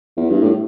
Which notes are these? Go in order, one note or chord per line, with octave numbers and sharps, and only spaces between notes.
E2
G2
A2